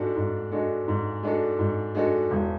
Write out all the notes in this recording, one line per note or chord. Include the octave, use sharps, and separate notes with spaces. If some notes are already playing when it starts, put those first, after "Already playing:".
Already playing: G#2 G#3 D4 F#4 A4
G#2
G#3 D4 F#4 A4
G#2
G#3 D4 F#4 A4
G#2
G#3 D4 F#4 A4
E1